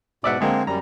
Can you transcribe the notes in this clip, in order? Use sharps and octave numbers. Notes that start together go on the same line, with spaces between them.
G#2 B2 D5 E5 F#5
D3 G#3 A#3 C4
F#2 G3 A#5